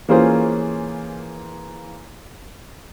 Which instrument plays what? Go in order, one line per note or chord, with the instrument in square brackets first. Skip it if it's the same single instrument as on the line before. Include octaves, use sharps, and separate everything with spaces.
[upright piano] E3 A#3 C#4 F4 G#4 C5